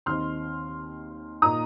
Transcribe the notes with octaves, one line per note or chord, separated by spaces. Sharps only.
D#2 D#3 C4 D#4 C6 F6
A#2 A#3 D#4 A#5 D#6